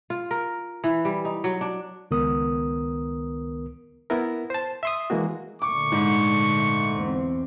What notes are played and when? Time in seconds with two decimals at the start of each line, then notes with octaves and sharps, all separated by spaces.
0.10 F4
0.31 A#4
0.84 E3
1.05 G3
1.25 D#4
1.44 F#3
1.61 D4
2.11 C#2 D#3 B3 A#4 D#6
4.10 B3 E4 A#4
4.50 C5 A5
4.83 E5 C6 D#6
5.10 E3 G#3 A#3 F#4
5.62 A#2 D3 A3 C#6 D6
5.92 G#2
6.96 E2 C4